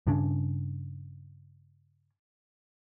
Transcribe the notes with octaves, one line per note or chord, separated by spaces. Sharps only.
G2 C#3 C#4 D4